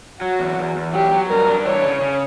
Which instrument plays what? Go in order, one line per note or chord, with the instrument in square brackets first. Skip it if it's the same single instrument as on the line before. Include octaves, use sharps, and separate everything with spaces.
[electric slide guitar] F#3 [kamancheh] F#4
[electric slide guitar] E2
E2
E2
[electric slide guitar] F#3 [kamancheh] G4
[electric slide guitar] F#3
[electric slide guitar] G2 [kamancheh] A#4
[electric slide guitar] D4
[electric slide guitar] E3 [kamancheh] C#5
[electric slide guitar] C#3
C#3